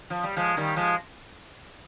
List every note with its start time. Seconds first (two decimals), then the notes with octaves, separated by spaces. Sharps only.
0.10 F3
0.23 G3
0.36 F3 G#3
0.57 D#3 G3
0.76 F3 G#3